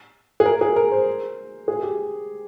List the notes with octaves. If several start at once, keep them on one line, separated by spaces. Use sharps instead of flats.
G#4
A#4
G#4
A#4
C5
G#4
G4